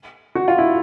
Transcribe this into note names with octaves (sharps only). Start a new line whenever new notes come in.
F#4
F4
E4